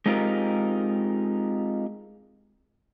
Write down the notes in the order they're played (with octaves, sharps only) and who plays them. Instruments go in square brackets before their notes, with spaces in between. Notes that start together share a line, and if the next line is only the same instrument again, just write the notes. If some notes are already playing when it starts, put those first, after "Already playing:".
[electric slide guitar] G#3 C4 D#4 F4 G4 A#4